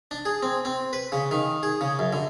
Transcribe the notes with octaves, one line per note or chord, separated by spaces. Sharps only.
D4
G#4
C4
C4
B4
C#3
D#3
G#4
C#3
F#2
D3